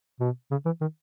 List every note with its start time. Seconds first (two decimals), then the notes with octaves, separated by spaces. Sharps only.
0.20 B2
0.51 C#3
0.66 E3
0.81 D#3